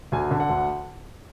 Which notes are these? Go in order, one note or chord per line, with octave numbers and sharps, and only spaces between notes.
D2 G#5
D3
F#5
D2